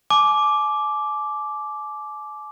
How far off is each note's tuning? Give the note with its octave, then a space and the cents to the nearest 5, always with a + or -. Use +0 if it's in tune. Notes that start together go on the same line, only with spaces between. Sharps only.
G#5 +45 D6 +0